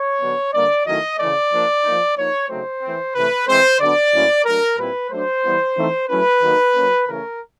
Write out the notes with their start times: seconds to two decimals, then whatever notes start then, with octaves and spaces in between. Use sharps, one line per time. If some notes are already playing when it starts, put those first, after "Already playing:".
Already playing: C#5
0.21 D3 F#3 B3 D4
0.53 D3 G3 A#3 D4 D5
0.86 D#3 F#3 A3 C#4 E4 D#5
1.19 C#3 E3 A3 D5
1.51 F3 A#3 D4
1.84 F3 A#3 D#4
2.16 F3 A#3 D#4 C#5
2.49 C#3 F#3 A3 C4 D#4 C5
2.82 E3 A3 C4
3.15 C3 E3 A3 B4
3.47 E3 G#3 C4 C5
3.80 D3 F#3 B3 D4 D5
4.12 A2 F#3 A#3 C#4 E4
4.45 F#3 A3 D4 A#4
4.78 A#2 G3 C4 E4 B4
5.10 F#3 A3 D4 C5
5.43 E3 G3 B3 E4
5.76 E3 A3 C4 D#4
6.08 F#3 A3 C#4 E4 B4
6.41 D#3 F#3 A#3 D#4
6.74 F#3 A#3 C#4
7.06 C#3 E3 A3 C#4 A#4